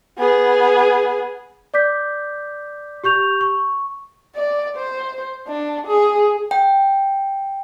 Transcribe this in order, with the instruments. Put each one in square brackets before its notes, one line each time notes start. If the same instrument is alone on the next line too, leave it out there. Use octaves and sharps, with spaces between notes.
[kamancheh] B3 G#4
[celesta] D5 D6 G6 B6
G4 C#6 G6 F7
C#6
[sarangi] D5
C5
D4
G#4
[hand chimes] G5